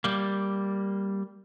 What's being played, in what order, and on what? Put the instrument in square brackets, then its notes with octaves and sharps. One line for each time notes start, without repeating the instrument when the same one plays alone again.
[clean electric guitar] G3 A#3